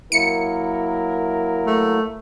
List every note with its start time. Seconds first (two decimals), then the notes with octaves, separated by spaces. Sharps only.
0.12 F#3 A#3 E4 A#4 C#7
1.66 A3